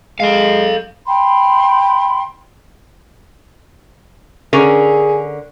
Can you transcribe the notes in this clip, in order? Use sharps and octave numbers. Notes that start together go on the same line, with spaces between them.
G#3 A4 F5
G5 B5 C6
D3 C#4 G#4 A#4